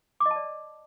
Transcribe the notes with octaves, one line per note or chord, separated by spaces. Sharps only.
D6
D#5
A5
D5